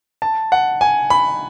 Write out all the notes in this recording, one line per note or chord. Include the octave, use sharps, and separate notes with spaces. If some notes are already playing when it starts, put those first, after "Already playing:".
A5
F#5
G#5
B5